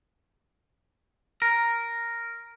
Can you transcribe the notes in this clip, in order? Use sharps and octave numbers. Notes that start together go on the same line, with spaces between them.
A#4